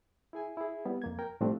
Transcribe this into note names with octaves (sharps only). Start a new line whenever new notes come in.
E4 G#4 G#5
E4 G#4
G3 B3
F2 A#3 G#6
A#4 G5
A2 F3 G3 A3 C4 D4